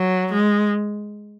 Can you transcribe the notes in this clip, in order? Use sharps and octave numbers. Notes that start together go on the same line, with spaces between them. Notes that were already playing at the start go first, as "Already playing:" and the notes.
Already playing: F#3
G#3